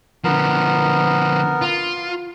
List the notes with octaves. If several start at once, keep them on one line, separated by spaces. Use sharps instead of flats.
D3 F3 B3 A#4
F4